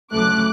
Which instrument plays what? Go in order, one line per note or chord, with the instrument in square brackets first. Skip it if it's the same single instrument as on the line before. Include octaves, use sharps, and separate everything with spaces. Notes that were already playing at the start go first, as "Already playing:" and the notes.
[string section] D2 C#3 F#3 A3 D6 F#6